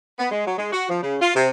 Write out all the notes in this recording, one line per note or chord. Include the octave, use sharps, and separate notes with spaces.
B3
G#3
F#3
G#3
F#4
F3
C#3
F4
C3